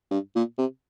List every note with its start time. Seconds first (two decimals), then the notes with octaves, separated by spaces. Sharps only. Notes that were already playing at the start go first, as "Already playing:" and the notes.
0.11 G2
0.35 A#2
0.58 C3